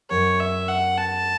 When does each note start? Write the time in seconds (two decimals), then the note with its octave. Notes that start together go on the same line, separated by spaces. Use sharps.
0.11 F#2 C#5
0.40 E5
0.68 F#5
0.98 A5